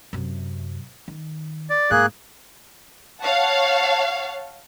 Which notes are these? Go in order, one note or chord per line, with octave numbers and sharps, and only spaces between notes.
F#2 C3
D#3
D5
G#2 A#3 G#4 F#6
C#5 F5 F#5 A5